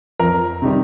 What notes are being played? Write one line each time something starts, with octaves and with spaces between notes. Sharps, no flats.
F2 A#4
C3 D#3 G3